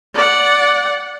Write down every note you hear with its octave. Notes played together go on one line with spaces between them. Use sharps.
D5 F#5